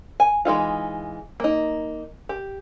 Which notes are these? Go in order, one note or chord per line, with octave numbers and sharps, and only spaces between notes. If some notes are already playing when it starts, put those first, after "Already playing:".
G#5
E3 G#3 D#4 F4
A#3 D#4
G4